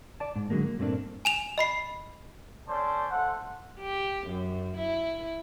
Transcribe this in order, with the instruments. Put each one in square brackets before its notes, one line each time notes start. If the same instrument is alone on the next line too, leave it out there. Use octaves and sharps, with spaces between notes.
[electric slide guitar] D5 A5
G#2
D3 F#3 G#3 A#3
A#3
G2 A#2 A3 C4 D4 A#4
[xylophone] G#5 E7 F7
D#5 B5 C7
[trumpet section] C#4 A4 C5 D5 A5
A3 C5 F#5
[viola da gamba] G4
F#2
E4